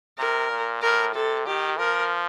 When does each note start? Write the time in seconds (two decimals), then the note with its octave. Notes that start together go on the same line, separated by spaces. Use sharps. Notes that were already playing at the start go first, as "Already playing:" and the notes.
0.18 C3 A#4
0.50 A#2
0.82 A2 A#4
1.15 C3 A4
1.46 D#3 G4
1.78 F3 A#4